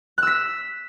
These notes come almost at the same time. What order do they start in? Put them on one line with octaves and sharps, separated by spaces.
F#6 E6 B6